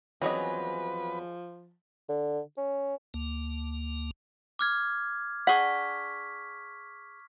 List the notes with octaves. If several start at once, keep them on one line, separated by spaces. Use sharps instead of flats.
E2 F3 F#3 C4 C#4 G#4 B4 D#5
D3
C#4
D2 A#3
D6 F6 G#6
D4 G#4 F#5 C#6 B6